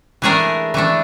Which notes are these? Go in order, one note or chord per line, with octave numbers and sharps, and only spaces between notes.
E3 A3 D4 G#4 A#4
E3 A3 D4